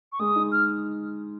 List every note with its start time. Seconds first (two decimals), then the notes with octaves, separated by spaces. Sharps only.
0.12 C#6
0.19 G#3 D#6
0.36 D#4
0.52 F6